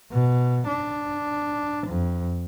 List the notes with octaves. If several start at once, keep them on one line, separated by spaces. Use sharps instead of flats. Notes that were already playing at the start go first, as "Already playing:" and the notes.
B2
D4
F2